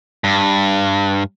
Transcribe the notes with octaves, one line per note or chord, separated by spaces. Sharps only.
G2